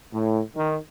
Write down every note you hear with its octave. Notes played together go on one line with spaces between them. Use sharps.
A2
D#3